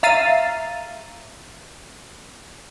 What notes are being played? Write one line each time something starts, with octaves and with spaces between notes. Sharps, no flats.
E5 F5 A#5 A6 C7 D#7